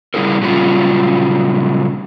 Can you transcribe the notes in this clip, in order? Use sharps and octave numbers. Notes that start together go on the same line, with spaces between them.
C#3 G3 B3 E4 G#4 A#4
A#2 C#3 F#3 G3 F4